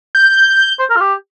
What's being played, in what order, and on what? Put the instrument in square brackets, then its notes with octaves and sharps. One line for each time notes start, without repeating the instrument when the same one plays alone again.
[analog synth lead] G6
[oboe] C5
A#4
F4
G4